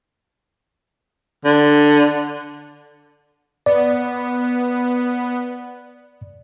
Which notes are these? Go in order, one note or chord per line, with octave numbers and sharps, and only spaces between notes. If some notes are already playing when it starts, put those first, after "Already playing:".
D3
B3 D5